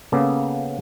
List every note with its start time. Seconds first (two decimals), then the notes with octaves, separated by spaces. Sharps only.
0.12 C#3 A#3 B3 A4